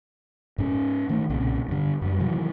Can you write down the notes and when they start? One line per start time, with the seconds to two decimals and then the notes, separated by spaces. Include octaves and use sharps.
0.58 G#2 C#4
1.09 D#3 A3
1.29 B1 A#2 C#3 C4
1.68 G2 D3
2.01 F#2 G3
2.20 C3 D#3 E3 F#3